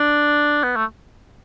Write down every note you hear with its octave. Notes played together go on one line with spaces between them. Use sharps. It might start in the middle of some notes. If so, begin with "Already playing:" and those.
Already playing: D4
B3
A3